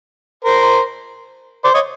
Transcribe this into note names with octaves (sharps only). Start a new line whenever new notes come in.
A#4 C5
C5 D5
C#5 D#5